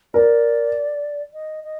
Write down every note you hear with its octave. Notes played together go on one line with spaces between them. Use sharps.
A#4 D5
D#5
D#5